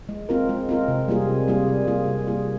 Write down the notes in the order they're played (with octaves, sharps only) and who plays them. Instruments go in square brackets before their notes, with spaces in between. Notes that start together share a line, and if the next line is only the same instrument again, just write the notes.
[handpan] G#3
C4 F4 A#4
G#3
C4 F4 A#4
C3
G3 A#3 F4 G#4
C3
G3 A#3 F4 G#4
C3
G3 A#3 F4 G#4
C3
G3 A#3 F4 G#4